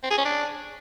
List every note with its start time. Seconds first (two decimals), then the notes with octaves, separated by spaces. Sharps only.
0.03 C4
0.10 G#4
0.18 C#4
0.25 D4